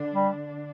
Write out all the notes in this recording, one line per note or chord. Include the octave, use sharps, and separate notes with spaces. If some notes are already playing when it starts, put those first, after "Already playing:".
Already playing: D3 D4
G3